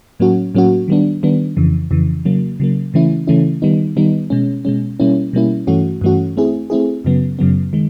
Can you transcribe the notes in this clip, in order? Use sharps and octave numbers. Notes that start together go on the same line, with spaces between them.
A2 F#3 A#3 C#4 F#4
A2 F#3 A#3 C#4 F#4
D#3 G3 B3 D4
D#3 G3 B3 D4
F2 C#3 E3
F2 C#3 E3
C#3 F#3 A#3
C#3 F#3 A#3
C#3 E3 A3 C#4 E4
C#3 E3 A3 C#4 E4
D#3 G3 B3 D#4
D#3 G3 B3 D#4
B2 G#3 C#4
B2 G#3 C#4
B2 G3 A#3 C#4 E4
B2 G3 A#3 C#4 E4
G2 E3 A3 C#4 F#4
G2 E3 A3 C#4 F#4
A3 C4 E4 G#4
A3 C4 E4 G#4
F#2 C#3 F#3 B3
F#2 C#3 F#3 B3
D#3 G#3